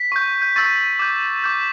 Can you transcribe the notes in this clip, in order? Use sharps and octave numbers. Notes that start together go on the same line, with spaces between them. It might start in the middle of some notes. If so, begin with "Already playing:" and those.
Already playing: B6
C#6 G6
G6
C#6 E6 G6 A6
D6 G6
D6 G6